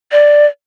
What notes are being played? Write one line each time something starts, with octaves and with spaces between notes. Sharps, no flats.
D5